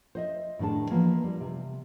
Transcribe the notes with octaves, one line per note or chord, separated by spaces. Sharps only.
C5 D#5 E5
A2 D#3 D4 G#4 A5
E3 F3 A#3 B3
G3
C3